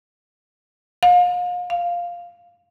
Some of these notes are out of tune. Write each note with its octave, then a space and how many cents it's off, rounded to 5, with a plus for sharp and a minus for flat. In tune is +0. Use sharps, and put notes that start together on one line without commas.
F5 +35
F5 +0